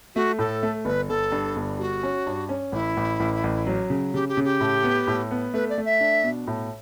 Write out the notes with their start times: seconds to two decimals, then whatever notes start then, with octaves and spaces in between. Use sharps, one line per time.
0.15 A3 F#4
0.39 A2 A4
0.63 A3
0.85 G1 B4
1.09 G1 A4
1.32 G2
1.56 G1
1.79 G3 F#4
2.03 C#4
2.27 G2
2.49 C#4
2.72 A1 E4
2.97 A1
3.20 A1
3.44 A1
3.67 F#3
3.90 C#3
4.14 C#3 G4
4.28 G4
4.37 C#3
4.45 G4
4.60 A2
4.84 B3
5.07 A2
5.31 B3
5.54 A3 B4
5.69 D5
5.78 A3
5.85 E5
6.00 D4
6.24 B2
6.47 A2